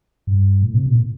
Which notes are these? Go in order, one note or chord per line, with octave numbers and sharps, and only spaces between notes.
G2
A2
C3
A#2